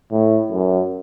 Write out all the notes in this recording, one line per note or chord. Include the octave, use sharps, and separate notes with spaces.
A2
F#2